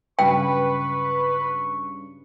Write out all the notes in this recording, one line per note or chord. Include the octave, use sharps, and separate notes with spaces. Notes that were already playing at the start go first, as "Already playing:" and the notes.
G2 C#3 F#3 B4 G5 C#6